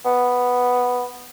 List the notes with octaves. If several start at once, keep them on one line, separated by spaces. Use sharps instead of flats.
B3